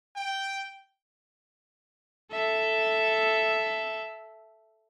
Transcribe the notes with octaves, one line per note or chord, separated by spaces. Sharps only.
G5
A4 E5